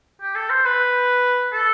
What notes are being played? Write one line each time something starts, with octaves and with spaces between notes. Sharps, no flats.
G4
A4
C5
B4
A4